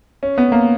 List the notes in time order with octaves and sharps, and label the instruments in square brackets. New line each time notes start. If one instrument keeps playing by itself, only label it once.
[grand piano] C#4
B3
A#3